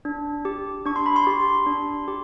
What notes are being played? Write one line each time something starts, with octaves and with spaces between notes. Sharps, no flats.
D4
G4
D4 C#6
C6
B5
C6
G4
D4
G4